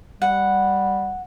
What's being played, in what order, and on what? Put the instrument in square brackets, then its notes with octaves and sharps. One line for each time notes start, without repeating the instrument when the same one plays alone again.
[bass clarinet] G3 [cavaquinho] F#5